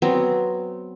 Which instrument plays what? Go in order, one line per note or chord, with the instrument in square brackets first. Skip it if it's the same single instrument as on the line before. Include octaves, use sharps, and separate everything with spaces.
[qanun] F#3 B3 C4